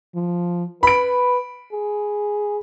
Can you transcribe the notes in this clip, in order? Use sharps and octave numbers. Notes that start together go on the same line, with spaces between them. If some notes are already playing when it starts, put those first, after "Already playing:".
F3
B4 B5 D7
G#4